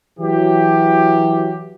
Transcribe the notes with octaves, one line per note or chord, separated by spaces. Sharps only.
E3 F#3 G4